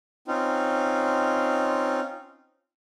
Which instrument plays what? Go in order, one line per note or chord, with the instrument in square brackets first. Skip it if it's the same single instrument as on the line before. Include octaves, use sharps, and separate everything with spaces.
[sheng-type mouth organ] C4 C#4 D#4 F4